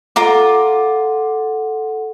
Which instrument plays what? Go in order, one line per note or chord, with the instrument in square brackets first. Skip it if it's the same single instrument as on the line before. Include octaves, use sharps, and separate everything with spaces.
[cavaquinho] F4 A#5 D6 [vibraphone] A4 F#5